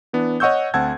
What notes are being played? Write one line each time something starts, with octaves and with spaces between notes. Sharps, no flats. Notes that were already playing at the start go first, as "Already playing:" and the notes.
E3 B3 D4
C#5 D#5 F#5 C#6 E6 G6
D2 C4 F#5 A5 E6 G#6